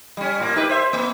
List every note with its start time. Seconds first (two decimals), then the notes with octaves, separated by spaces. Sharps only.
0.17 G3 C#4
0.40 A2 A#3
0.56 D#4 G4 B4
0.69 C5 E5
0.93 A#3